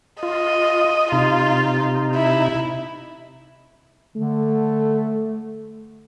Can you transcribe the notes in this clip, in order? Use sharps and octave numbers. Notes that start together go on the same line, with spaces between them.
F4 D#5
C3 D#4 F4
E4
D3 A3